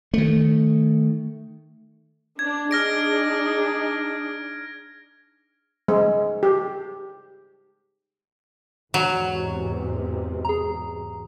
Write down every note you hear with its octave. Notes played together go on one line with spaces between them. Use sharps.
D#3 A3
D4 G#6
D4 D#4 G#4 F6 A#6 D7
G#3
G4
E2 G#2 C3 F#3
G#4 A#5